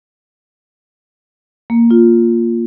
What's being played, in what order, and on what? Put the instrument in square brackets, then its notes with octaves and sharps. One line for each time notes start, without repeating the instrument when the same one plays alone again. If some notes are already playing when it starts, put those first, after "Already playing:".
[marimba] A#3
F4